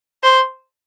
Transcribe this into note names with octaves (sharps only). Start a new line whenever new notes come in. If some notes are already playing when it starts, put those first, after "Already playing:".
C5